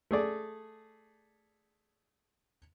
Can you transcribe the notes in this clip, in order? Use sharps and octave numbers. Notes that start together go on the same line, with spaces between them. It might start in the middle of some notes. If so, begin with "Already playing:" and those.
A3 G#4 D5